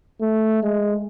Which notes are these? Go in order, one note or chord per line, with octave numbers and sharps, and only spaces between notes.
A3
G#3